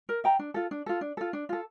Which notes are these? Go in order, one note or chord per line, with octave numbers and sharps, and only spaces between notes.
A#4
E5 G5 A#5
D4
F4 A4
D4
F4 A4
D4
F4 A4
D4
F4 A4